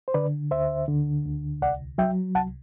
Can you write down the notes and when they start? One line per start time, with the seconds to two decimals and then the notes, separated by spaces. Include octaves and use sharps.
0.08 C5
0.14 D3 B4 D5
0.51 D2 C5 E5
0.88 D3
1.25 D2
1.62 C2 D5 F#5
1.98 F#3 E5 G5
2.35 C2 F#5 A5